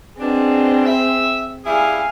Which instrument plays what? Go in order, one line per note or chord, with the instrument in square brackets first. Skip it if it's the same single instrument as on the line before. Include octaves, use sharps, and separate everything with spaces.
[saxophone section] B2 D4 [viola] C4 G#4
[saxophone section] E5
[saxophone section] G3 E4 G#4 [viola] F5 G#5